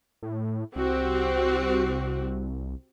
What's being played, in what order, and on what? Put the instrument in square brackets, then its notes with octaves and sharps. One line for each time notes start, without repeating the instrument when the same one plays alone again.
[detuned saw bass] A2
[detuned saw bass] C2 [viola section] C4 F#4 G4